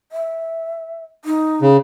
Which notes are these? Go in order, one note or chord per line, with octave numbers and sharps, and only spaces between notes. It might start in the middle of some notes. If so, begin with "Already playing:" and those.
E5
D#4
C#3